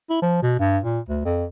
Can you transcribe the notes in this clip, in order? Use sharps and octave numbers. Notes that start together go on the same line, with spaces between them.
E4
F3
B2
G2
A#2
D2
F2